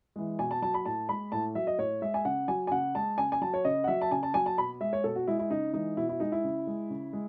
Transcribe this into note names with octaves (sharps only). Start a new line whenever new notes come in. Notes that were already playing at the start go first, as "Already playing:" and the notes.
E3 G#3
B2 G#5
A5
F#3 A5
B5
A2 A5
G#3 B5
A2 A5
F#3 E5
D#5
A2 C#5
G#3 E5
G#5
C#3 F#5
F#3 G#5
G#5
C#3 F#5
G#3 A5
C#3 G#5
G#5
F#3 A5
C#5
C#3 D#5
F#5
F#3 E5
A5
C#3 G#5
A5
F#3 G#5
A5
B2 B5
G#3 E5
C#5
B2 A4
F#4
G#3 E4
E4
C#3 D#4
E3 G#3 D#4
B2 E4
E4
G#3 D#4
E4
C#3
G#3
C#3
G#3